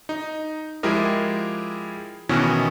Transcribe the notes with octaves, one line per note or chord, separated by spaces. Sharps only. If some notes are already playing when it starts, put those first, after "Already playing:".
D#4
F3 G#3 E4 G4 G#4 A#4
B2 D#3 E3 B3 C#4